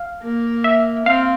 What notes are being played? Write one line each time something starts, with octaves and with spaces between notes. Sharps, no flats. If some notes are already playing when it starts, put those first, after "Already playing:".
Already playing: F5
A#3
E5
C4 F5